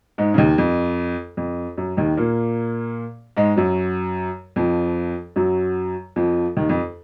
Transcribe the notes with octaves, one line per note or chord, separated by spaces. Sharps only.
G#2 G#3
C#3
D#2 D#3
F2
F2
F#2
D#2 D#3
A#2 A#3
G#2 G#3
F#2 F#3
F2 F3
F#2 F#3
F2 F3
D#2 D#3
F2